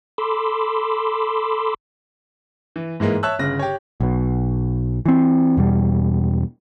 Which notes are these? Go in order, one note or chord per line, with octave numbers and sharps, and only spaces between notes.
A4 B5 C6 D6 E6
E3
G#2 E3 G#3 A#3
C#5 E5 A5 E6 F#6
G1 C#3 A#6
G4 C#5
B1 B2
E3 C4
E2 B2 G3